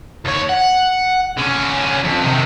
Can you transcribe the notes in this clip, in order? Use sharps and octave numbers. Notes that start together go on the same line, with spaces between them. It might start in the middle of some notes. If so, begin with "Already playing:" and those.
D#2 C#5
F#5
D3 C#4
F2
C3 D#3